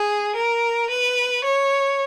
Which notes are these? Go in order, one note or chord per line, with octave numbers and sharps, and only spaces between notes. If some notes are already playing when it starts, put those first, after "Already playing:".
Already playing: G#4
A#4
B4
C#5